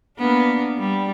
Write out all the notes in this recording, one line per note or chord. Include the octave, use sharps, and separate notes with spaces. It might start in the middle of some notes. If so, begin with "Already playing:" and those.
A#3 B3 D4
G3